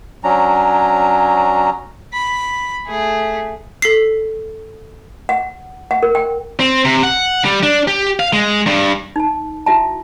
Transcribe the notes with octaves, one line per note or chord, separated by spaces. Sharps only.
F#3 C#4 D4 A#5
B5
A3 G#4
A4 B6 C7
F#5
F#5
A#4
G5
C4
C3
F#5
G3
D4
G4
F5
G#3
G2
D#4 A5
E4 F#4 E5 A5